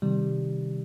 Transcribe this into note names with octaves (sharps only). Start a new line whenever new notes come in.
C3 D#3 G3